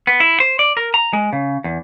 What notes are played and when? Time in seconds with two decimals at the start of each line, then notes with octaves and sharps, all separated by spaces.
0.07 B3
0.20 E4
0.40 C5
0.59 D5
0.77 A#4
0.94 A#5
1.13 G#3
1.33 C#3
1.64 E2